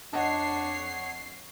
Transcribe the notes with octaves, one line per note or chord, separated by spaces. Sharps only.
F2 D4 C#5 D#5 F#5 A5 C7